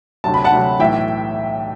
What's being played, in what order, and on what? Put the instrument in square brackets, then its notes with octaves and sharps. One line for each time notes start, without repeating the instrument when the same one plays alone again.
[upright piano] D2 C3 F#3 A5
B5
F#5 A5
D2 C3 F#3
B1 A2 E3 E5 G5